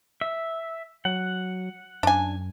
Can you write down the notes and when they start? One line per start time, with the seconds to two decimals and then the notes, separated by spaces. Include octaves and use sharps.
0.21 E5
1.05 F#3 F#5
2.03 F#2 D4 G#5